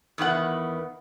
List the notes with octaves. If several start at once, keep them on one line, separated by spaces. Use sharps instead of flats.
E2 D#3 B3 F#5